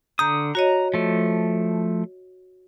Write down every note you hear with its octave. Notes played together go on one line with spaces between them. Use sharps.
D3 A#5 D#6 G6
F#4 C#5 D#5 A#5
F3 A3